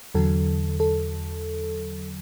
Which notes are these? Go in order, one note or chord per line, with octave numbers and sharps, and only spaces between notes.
E2 D3 F#3 A4
A4